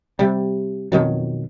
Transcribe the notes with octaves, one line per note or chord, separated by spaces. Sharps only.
C3 G3
F2 B2 D#3 F#3